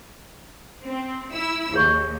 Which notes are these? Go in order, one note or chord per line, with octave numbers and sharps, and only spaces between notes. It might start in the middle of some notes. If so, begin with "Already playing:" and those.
C4
E4 E6
D#2 G#4 C#5 C#6